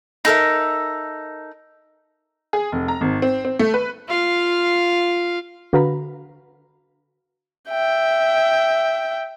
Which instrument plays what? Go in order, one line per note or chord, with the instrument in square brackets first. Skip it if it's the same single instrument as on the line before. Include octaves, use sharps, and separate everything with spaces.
[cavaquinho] D#4 A4 A#4 E5
[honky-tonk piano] G#4
F1
A#5
G#1
C4
C4
A3
B4
[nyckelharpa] F4 F5
[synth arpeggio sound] D3 F#4 B4 F5 A#5 B5
[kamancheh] E5 G5